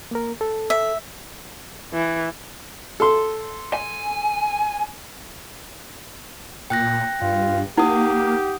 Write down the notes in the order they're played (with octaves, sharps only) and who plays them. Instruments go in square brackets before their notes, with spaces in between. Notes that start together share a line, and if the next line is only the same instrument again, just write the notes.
[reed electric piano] A#3 A#4
A4
[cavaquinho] E5
[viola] E3
[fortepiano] A4 C6
[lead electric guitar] G#5
[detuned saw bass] A#2 [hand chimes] G5 F#6 A#6
[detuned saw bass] G2 [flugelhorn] F4
[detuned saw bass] A#3 [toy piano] D#4 [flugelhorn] G4 [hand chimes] F#5 D#6